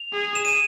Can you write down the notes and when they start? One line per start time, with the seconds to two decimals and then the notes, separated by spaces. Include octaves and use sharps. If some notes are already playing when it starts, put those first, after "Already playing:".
Already playing: F7
0.13 G#4
0.35 E7
0.45 D#7